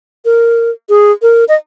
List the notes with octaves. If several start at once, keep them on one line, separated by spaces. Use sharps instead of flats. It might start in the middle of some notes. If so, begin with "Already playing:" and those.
A#4
G#4
A#4
D#5